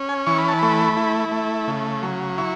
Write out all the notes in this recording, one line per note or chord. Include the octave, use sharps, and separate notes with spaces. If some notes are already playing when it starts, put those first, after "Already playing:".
Already playing: C#4
G#5
E3 C#6
B5
A5
A3 B5
E4
A3
C#3
F#3
E4 C#6